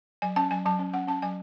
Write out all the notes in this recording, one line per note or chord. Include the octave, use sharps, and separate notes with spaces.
F#3 G#5
C#4 A5
F#3 G#5
F#3 A5
C#4
C#4 F#5
C#4 A5
F#3 G#5